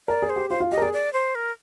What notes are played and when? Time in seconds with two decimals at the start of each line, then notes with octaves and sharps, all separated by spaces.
0.08 A#4 D5
0.22 G#4
0.30 C5
0.36 G4
0.50 F4 C5
0.60 F4
0.72 G4 D#5
0.77 A#4
0.82 G#4 D5
0.93 D5
1.13 C5
1.35 A#4